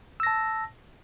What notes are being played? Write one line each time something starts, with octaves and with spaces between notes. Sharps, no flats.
A5 E6 A#6